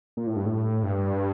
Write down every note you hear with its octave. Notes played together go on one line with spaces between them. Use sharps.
A#2
A2
G2
A2
G2